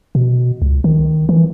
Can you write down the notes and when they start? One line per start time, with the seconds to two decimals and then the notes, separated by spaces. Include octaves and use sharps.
0.15 B2
0.62 C#2
0.84 D#3
1.29 E3